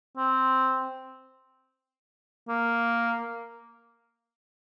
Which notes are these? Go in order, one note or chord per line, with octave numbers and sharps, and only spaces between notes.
C4
A#3